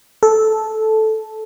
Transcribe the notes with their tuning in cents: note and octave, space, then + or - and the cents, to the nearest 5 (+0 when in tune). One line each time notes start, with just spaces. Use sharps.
A4 -10